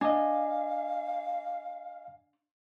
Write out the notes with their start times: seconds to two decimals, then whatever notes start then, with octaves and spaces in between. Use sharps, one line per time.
0.01 D4 D#5 F5 G#5